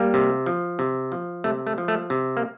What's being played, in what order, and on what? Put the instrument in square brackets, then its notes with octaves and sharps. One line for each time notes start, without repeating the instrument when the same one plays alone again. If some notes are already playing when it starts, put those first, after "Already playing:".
Already playing: [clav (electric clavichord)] G3 A#3
C3
F3
C3
F3
C3 A3
A3
F3
A3
C3
A#3